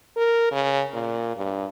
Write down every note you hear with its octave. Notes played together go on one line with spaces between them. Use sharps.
A#4
C#3
A#2
G2